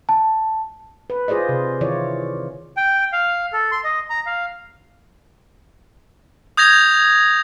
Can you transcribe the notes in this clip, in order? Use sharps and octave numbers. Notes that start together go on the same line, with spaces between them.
A5
B4
F4 G#4 C5 D5 D#5
C3
D#3 E3 E4 F4 C#5 D5
G5
F5
A4
C6
D#5
A#5
F5
D#6 G6 G#6 A#6 F7